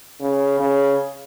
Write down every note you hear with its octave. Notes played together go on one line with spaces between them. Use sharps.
C#3
C#3